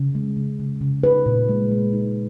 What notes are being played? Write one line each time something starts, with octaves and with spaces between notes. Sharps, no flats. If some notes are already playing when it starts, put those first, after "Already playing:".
Already playing: C#3
G#3
C#3
C#3
C#3
D#4 B4
A#2
G#3
G#3
D#4